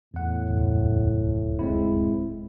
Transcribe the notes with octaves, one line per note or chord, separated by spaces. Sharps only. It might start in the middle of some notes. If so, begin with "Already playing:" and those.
E2 A2 F#5
D1 C#2 F#2
G#3 C4 E4